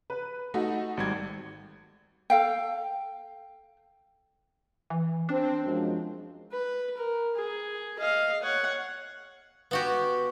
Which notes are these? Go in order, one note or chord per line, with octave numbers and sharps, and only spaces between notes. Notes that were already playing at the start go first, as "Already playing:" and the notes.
B4
A3 D#4 F#4
G#1 G3 G#6
A4 F5 G5
E3
C4 D4
F#2 F3 G#3
B4
A#4
G#4
D#5 F5
C#5 F#5
B3 F#4 G4